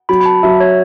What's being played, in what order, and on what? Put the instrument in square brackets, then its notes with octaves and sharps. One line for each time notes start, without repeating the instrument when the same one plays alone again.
[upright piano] F#3 [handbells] B5
[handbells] B5
A5
[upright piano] F#3 [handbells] E5
[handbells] C#5